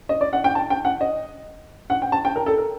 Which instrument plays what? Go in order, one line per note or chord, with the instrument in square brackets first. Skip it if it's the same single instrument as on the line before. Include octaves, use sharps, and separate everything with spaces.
[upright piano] D#5
D5
F#5
G5
A5
G5
F#5
D#5
F#5
G5
A5
G5
A#4
A4
A#4